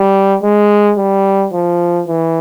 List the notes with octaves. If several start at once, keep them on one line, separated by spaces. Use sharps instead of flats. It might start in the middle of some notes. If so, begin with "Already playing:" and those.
Already playing: G3
G#3
G3
F3
E3